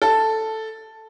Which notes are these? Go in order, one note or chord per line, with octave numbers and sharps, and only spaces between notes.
A4